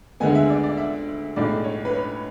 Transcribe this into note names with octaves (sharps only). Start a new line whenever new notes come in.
D2 D3 G#3 B3 G#5
E5
D5
D5
E5
B1 A2 G#3 D5
C#5
B4
C#5